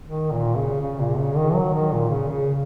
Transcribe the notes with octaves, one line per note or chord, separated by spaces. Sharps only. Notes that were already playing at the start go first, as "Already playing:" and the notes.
D#3
A#2
C#3
C#3
A#2
C#3
D#3
F#3
D#3
A#2
C#3
C#3